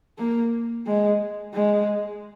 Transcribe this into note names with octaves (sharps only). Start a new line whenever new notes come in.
A#3
G#3
G#3